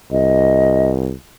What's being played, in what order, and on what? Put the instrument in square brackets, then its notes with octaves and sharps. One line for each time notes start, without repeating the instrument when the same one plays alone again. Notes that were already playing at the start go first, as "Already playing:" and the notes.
[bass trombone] C2 [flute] D#5